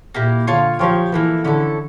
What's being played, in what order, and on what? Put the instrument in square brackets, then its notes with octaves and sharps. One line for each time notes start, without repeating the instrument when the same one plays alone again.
[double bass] A#2 [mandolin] A#3 E4 G4
[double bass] D3 [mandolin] F4 C#5 F5 A5
[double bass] F3 [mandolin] G4 C#5 G5
[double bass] E3 [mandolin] A#3 E4 A4
[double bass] D3 [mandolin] C#4 E4 A4